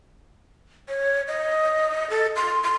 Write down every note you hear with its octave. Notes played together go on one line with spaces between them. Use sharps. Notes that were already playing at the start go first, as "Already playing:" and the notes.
C#5
D#5
A4
C6
C6